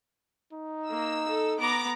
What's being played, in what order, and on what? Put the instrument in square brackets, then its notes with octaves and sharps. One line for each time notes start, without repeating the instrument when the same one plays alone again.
[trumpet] D#4
[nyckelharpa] A#3 [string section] E6
[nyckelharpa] A4
[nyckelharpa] B3 [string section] A#5 D6